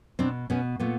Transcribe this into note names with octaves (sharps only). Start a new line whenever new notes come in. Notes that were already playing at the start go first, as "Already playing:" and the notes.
B2 C4 D4
B2 B3 C#4
A#2 A3 B3